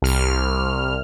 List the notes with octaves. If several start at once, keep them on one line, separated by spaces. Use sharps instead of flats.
C2 F6